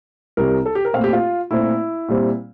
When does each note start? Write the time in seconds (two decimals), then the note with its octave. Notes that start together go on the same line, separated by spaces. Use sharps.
0.37 C2 C3 G3 A#4
0.66 A4
0.75 G4
0.85 A#4
0.93 A#2 A3 C4 F5
1.04 G4
1.13 F4
1.51 A#2 A3 C4 E4
2.09 A#2 G3 C4